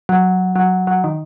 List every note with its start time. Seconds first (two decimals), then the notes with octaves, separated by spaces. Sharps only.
0.09 F#3
0.56 F#3
0.87 F#3
1.04 D#3